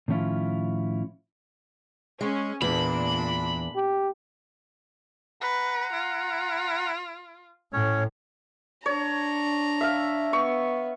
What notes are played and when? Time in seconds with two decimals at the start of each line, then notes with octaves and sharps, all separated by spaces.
0.08 A2 D#3 F3 C#4 E4 F4
2.21 G#3 C#4
2.62 E2 A#2 D4 B5
3.75 G4
5.41 B4 F#5 A#5
5.93 F4
7.73 A2 C#4 C#5
8.86 D4 C#5 A#5
9.81 E5 F5
10.33 B3 C#6